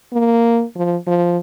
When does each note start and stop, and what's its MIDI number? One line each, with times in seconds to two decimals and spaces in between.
0.13 0.64 58
0.76 0.97 53
1.07 1.38 53